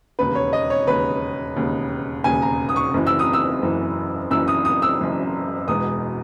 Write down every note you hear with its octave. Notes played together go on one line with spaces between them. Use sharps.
E1 D#2 C#3 B4
C#5
D#5
C#5
E1 D#2 C#3 B4
E1 D#2 C#3
E1 D#2 C#3 G#5
A#5
D#6
C#6
F#1 F#2 E3
E6
D#6
E6
F#1 F#2 E3
F#1 F#2 E3 E6
D#6
D#6
E6
F#1 F#2 E3
E1 E2 B2 G#3 D#6